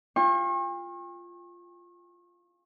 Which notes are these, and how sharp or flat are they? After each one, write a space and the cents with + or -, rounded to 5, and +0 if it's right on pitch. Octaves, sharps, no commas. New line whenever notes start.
F4 +0 G5 +45 C#6 -40